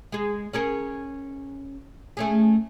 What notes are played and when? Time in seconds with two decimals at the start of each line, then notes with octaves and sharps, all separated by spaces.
0.12 G#3 G#4
0.53 C#4 G#4 A#4
2.17 A3 C#4 G#4